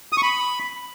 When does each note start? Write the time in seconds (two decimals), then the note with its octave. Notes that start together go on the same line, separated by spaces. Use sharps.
0.13 D#6
0.18 C#6
0.23 B5